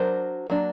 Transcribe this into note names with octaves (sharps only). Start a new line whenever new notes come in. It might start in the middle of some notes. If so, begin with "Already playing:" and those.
Already playing: F#3 D4 A#4 C5
F#3 A#3 D4